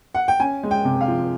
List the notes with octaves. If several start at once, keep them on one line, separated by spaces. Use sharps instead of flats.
F#5
G5
C#4 G#5
G#3
G5
C3
F5
F3